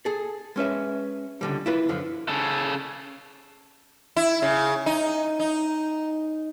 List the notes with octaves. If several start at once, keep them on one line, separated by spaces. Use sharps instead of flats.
G#4 A4
G#3 C#4 B4 E5
C#2 D3 G3
E4 F4 B4
F#2 D3 F3
C#3 A4
E4
C#3
D#4
D#4